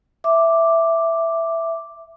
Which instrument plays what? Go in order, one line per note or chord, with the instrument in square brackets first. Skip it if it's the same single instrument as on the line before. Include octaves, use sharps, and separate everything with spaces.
[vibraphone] E5 D6